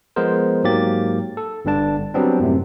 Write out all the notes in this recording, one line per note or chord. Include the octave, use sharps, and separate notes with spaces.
F3 G#3 B3 A#4 C5
G#2 F#3 A#3 G4 A6
A4
G1 G2 D3 D4 A5
F#3 G3 B3 C4 D4
F#2 A2 C3